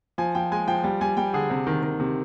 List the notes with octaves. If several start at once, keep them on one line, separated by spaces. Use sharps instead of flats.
F3 G#5
F3 G5
G#3 G#5
F3 G5
G3 G5
G3 G#5
G3 G5
D3 G#4
C3
D#3
D#3
C3